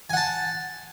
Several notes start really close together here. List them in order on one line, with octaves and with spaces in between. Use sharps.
G#5 F#5 A5